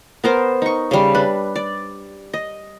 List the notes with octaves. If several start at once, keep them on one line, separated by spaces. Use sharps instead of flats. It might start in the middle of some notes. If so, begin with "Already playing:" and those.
B3 A#4 C5
D#4 C#6
C#3 G3
D4 B4
D5
D#5